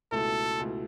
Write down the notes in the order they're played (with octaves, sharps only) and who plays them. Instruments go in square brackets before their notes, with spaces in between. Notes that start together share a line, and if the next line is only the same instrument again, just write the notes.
[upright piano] C#2 B2 A3 E4 [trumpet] A4
[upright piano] C#2 B2 A3 E4